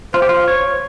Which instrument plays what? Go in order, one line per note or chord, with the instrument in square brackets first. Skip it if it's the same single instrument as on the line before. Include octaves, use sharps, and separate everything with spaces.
[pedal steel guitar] F4 [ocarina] C5
[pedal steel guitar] G4
F4
C#5